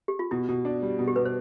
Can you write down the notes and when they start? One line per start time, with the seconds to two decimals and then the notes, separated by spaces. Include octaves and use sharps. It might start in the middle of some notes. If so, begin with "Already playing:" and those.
0.08 G4
0.19 F4
0.31 B2 E4
0.49 B2
0.65 D4
0.82 G3
0.99 B2
1.08 G4
1.16 B2 B4
1.25 C5